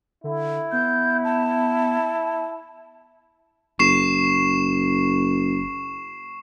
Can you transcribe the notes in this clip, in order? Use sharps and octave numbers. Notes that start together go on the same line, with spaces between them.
D3 E4
B3 G6
A5
F#1 C#6 C7 E7